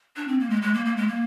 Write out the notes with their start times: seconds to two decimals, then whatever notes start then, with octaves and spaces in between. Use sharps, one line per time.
0.16 D4
0.28 C4
0.40 A#3
0.50 G#3
0.62 G#3
0.74 A#3
0.85 A#3
0.97 G#3
1.08 A#3